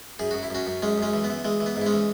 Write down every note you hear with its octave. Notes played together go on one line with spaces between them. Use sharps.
F#2 G#4
F#2 F#4
E4
F#2 C#4 F#4
F#2
F#2 G#3 C#4
F#2 G#3 C#4
E3
B3
E3
E3 G#3
E3
B3
G#2
E4
G#3 C#4
E3